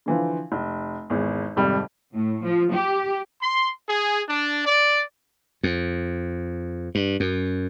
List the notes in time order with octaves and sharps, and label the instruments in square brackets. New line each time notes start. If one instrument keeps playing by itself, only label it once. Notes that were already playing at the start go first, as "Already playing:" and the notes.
[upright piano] D3 E3 F3
F1
G#1 E2
G#1 F2 C3 G3 B5
[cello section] A2
F3
G4
[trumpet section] C6
G#4
D4
D5
[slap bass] F2
G2
F#2